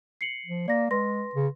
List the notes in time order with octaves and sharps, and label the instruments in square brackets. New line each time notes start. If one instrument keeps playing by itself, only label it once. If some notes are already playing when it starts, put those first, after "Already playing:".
[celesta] C7 C#7 F#7
[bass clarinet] F3
[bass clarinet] A#3 [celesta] D5 A#6
[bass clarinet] G#3 [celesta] B4 C6 A#6
[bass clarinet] C#3